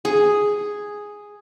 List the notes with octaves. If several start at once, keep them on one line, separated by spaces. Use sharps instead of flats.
G#4